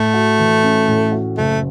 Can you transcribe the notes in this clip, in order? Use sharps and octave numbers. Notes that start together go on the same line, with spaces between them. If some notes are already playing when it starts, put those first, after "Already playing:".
Already playing: A2 A3
F#4
E3
C#4
A2
F#4
F#1 A3